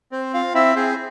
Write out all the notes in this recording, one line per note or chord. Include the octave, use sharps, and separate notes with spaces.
C4 C5
F4 F5
C4 E4 E5
C4 G#4 C5